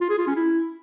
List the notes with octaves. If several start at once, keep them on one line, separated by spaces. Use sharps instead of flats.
F4
G#4
F4
C#4
E4